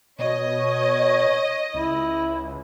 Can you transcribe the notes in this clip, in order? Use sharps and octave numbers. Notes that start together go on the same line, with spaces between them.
B2 C#5 D#5
C#2 E4